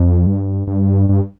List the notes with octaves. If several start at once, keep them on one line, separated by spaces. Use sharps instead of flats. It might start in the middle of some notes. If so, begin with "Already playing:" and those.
Already playing: F2
G2
G2
G2